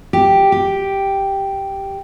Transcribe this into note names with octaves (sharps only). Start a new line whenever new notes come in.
G4
G4